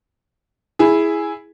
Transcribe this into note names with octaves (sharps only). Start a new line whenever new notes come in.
E4 G#4